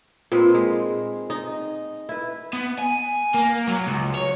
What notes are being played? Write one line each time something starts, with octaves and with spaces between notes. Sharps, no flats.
A#2 C4 D#4 B4
G#3
D#4
E4 B4
B3
G#5
A#3
F#3
C#2
C#5